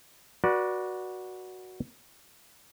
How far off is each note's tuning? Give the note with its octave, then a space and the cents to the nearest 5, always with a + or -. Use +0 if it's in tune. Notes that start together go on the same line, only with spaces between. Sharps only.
F#4 +0 B4 -35 D5 +0